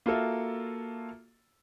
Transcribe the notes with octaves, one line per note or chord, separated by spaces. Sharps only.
A#3 F4 F#4 A4 E5